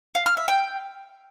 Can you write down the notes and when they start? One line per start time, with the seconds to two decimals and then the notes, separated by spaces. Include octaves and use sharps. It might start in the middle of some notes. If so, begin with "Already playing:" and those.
0.15 F5
0.26 F6
0.37 E5
0.48 G5